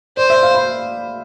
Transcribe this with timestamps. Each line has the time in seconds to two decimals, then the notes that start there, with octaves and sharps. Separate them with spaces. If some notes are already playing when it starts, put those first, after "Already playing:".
0.17 C5 D5
0.30 E5
0.43 F5
0.54 B5